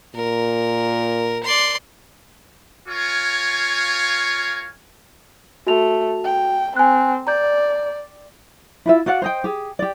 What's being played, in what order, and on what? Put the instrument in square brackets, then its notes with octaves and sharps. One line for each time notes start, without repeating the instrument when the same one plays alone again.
[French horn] A#2 [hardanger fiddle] A#4
[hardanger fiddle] D5 C6
[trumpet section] F4 A#4 C#5 F5 G#5 C#6
[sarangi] A3 [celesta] F#4 F7
[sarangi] G5
[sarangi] C4 [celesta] G#5 F#6
[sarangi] D5 [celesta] A#5 G6
[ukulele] E4 F4 E5
F#4 D5 F5 F#5
C5 D#5 G5
G4 G#4
G4 D5